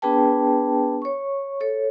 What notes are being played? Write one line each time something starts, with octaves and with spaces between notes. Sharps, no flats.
B3 D4 G#4 B4 G5 A5
C#5 C#6
A4 C#5